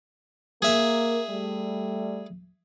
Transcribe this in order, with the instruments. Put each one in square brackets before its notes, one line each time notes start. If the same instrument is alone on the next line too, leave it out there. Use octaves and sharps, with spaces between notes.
[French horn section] A#3 [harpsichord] G#4 E5
[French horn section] G3 A3